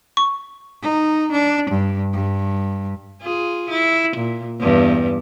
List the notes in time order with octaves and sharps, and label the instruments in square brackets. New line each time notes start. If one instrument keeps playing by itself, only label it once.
[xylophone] C#6
[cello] D#4
D4
G2
G2
[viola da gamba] F4 G#4
E4
A#2
E2 G2